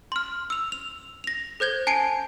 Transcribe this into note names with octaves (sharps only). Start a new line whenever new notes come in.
C6 F6
E6 F7
F7
A#6 F7
A4 C5 G6 G#6 G7
G#5 A5 C7 D7